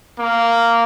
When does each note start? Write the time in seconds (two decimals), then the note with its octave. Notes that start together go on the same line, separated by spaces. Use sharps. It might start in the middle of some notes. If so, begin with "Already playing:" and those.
0.17 A#3